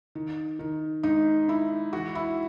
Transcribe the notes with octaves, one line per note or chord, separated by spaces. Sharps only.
D#3
D#3
G#2 D#4
G#2 E4
E3 F#4
E4